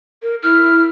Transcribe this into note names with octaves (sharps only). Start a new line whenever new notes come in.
A#4
E4 F6